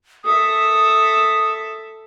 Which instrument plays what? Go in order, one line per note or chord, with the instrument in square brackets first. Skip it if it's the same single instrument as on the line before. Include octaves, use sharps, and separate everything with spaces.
[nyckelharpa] A4 E5 [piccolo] D#6